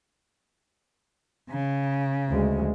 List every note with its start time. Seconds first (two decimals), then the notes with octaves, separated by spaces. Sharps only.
1.50 C#3
2.30 D2 G#3